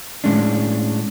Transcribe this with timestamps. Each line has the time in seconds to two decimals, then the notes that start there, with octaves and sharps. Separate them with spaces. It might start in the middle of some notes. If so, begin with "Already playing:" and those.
0.24 A2 G#3 C#4 D4